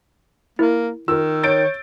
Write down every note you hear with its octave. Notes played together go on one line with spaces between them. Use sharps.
A#3 E4 A#4
D#3 F4 A#4 E6
C#5 G6 A6 D7